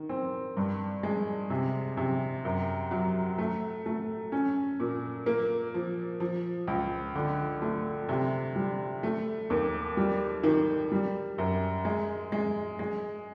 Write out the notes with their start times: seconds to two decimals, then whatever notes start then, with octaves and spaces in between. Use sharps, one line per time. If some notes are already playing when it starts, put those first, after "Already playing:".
Already playing: D#3
0.09 C4
0.57 G2
1.03 G#3
1.50 C3
1.97 C3
2.45 F#2
2.91 F#3
3.38 A3
3.86 A3
4.32 C#4
4.80 A#2
5.26 A#3
5.74 F3
6.20 F3
6.68 C#2
7.15 D3
7.62 A3
8.09 C3
8.56 G3
9.03 A3
9.50 D#2
9.97 G3
10.43 D#3
10.92 G3
11.38 F#2
11.85 G#3
12.32 G#3
12.79 G#3